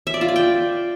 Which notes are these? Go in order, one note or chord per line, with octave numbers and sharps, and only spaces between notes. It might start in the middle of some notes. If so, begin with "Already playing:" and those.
E5
D5
F4
D5
G5